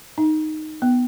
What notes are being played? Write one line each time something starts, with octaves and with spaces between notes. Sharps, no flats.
D#4
B3